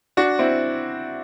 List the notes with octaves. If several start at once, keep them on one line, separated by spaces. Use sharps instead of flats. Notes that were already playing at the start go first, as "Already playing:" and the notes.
D4 F#4
C4 E4